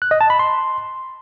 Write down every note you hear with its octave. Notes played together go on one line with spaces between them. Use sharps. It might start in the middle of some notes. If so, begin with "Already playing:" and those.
F#6
D#5
A5
B5
C6